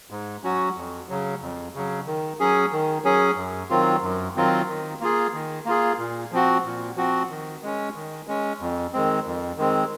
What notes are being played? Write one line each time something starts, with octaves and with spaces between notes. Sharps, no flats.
G#2
F#3 C#4 F#4
F2
C#3 F#3
F2
C#3 F#3
D#3
F#3 C#4 G#4
D#3
F#3 C#4 G#4
F#2
D#3 F#3 C4 F4
F#2
D#3 F#3 C4 F4
D#3
A#3 F4 G#4
D#3
A#3 F4 G#4
A#2
F3 C4 F#4
A#2
F3 C4 F#4
D#3
G#3 C#4
D#3
G#3 C#4
F2
D#3 G#3 C4
F2
D#3 G#3 C4